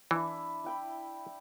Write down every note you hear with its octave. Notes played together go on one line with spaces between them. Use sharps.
E3 D4 E4
E4 G5 B5